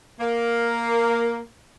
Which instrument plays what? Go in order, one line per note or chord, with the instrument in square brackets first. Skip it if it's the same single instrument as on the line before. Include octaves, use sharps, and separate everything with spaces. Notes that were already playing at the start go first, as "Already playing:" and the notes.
[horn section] A#3